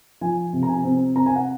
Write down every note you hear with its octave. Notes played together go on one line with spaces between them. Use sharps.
F3 G#5
C3
A#5
G#5
C4
C4 A#5
G#5
F#5